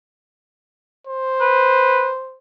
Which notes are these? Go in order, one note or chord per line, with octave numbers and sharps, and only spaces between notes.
C5
B4